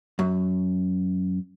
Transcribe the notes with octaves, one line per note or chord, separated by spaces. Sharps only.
F#2